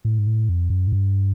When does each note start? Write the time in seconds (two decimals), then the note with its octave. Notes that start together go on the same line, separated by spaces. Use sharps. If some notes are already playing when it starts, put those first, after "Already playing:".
0.05 A2
0.19 G#2
0.27 A2
0.49 F2
0.70 F#2
0.87 G#2
0.92 G2